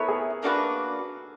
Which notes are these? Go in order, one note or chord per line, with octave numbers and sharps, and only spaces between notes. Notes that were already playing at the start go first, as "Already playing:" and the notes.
Already playing: B3 E4 A4 A#4 C#5
G#4
A#3 D4 F#4 B4